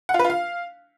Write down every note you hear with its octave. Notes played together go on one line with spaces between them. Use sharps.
F#5
F4
B4
F4
F5